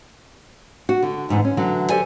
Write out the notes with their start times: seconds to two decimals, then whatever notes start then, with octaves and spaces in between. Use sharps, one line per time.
0.89 F#4
1.03 D3
1.29 F2 G#2 D3 E3
1.45 C#4
1.57 D3 E3 F#3
1.89 G4 A4 C5 D5 G#5